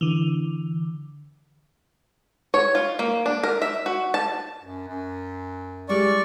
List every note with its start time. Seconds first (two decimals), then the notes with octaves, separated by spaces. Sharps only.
0.01 D3 E3
2.54 C#5
2.75 F4
2.99 A#3
3.26 D4
3.43 A#4
3.62 E5
3.86 F#4
4.14 A5
4.63 F#2
4.88 F#2
5.89 G3 G#3 E4 D5 C#6